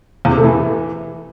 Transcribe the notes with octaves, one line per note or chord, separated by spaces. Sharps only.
E2
C3
A3
E3